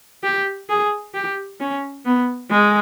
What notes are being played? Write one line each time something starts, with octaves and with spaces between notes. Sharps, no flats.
G4
G#4
G4
C#4
B3
G#3